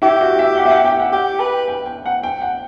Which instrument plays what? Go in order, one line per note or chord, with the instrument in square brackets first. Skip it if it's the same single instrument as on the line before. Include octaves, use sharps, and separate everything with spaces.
[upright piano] E4 [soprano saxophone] G4
[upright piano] F#4
E5
F#5
E5
F#5
G5
F#5
[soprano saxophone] G4 [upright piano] F#5
[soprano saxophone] B4
[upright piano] G5
G5
F#5
G5
F#5